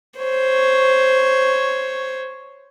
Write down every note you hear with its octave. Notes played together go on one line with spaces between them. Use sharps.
C5 C#5